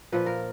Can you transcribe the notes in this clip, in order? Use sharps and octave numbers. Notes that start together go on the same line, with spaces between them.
A#2 F3 B4
A#4